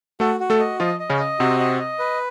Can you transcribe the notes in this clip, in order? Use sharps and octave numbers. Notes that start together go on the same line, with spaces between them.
A3 F#4 A4
F#4
A3 A4
D#5
F3 F4 D#5
D#5
C#3 C#4
D#5
C3 C4 F#4
D#5
D#5
B4